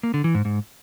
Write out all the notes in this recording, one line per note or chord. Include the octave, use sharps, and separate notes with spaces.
A#3
D3
E3
G#2
G#2